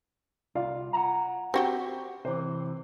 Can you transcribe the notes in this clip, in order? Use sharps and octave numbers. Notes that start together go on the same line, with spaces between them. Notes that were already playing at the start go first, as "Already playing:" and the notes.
C2 F4 D5 F5
F#5 A5 A#5
C4 F#4 G4 G5
C3 E3 C5